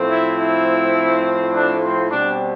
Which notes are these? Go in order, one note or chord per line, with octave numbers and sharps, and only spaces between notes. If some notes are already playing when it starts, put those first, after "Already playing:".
Already playing: A2 F3 A3 C4
E4
E4
D4
C4
B2 G3 C4 D4